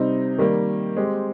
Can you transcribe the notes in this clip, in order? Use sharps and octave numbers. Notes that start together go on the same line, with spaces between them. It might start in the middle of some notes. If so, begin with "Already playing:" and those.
Already playing: C3 G3 C4 D#4
D#3 G3 A#3
G#3 C4 G4